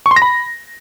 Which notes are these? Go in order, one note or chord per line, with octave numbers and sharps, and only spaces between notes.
C#6
C6
A#6
B5